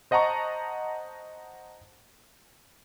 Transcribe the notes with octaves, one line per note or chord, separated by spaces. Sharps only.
C5 D#5 F#5 A5 A#5 C#6